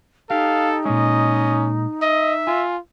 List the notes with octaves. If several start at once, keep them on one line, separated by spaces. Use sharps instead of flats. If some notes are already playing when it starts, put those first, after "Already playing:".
D#4 G4 A4 F5
A#2 G#3 C#4 D#5
D#5 E5
F4 G#5